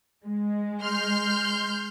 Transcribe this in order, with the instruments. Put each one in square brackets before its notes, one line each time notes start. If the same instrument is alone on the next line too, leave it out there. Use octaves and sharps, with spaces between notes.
[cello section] G#3
[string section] C6 F6 G6